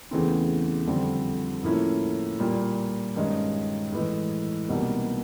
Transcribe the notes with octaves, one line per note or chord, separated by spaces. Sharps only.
E2 C#3 E3 A3 C4
F2 D3 G3 C4
A2 F3 A#3 C#4 E4
A#2 G3 A#3
G2 D#3 G#3 C#4
A2 E3 G#3
C2 B2 G3 A#3 D#4